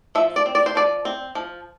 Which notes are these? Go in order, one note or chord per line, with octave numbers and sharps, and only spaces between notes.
F3 E5
D5
C4
D5
C5
F3 D5
C4
F3